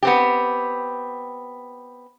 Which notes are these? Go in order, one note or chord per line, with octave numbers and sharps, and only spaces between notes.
B3 C4 G4